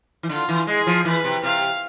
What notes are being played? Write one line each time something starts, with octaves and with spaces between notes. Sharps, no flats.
E3
D3 F4
E3
G#3 G#4
F3
E3 B4
C3
C3 F5